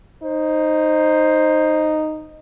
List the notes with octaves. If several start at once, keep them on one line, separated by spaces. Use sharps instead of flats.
D#4 C5